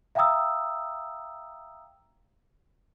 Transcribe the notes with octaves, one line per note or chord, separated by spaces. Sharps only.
E5 F5 G5 A#5 D#6 E6